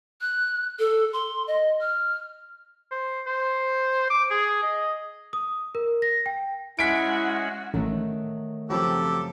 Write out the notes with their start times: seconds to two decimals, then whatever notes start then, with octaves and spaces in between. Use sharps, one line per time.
0.21 F#6
0.79 A4
1.13 C6
1.47 D#5
1.81 F6
2.91 C5
3.26 C5
4.10 D6
4.30 G#4
4.63 D#5
5.33 D#6
5.75 A#4
6.02 A#6
6.26 G5
6.79 G#3 C#4 E4 F#4 F#5 B6 D7
7.74 A1 D#3 F#3 A3
8.70 F#2 C#3 F3 F#3 C4 G4 A4 B5